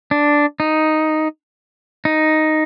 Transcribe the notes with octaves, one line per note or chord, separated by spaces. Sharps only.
D4
D#4
D#4